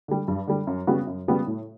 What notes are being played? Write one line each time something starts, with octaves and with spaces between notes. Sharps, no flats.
D3 G3
G2
D3 G3
F#2
C#3 G3 B3 F#4
F#2
C#3 G3 B3 F#4
A2